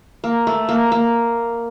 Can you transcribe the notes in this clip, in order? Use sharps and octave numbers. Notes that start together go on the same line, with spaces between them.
A#3
A3
A#3
A#3